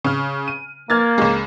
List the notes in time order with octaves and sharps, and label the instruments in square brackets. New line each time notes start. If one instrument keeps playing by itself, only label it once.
[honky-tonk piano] C#3 F6
D#7
[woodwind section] A#3 [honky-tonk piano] F6 G#6 A6
[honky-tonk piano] C#2 G#3